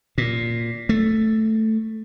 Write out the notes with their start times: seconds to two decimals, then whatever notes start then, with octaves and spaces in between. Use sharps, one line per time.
0.18 A#2
0.89 A3